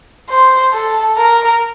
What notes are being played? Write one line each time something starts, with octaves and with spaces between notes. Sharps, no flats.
C5
A4
A#4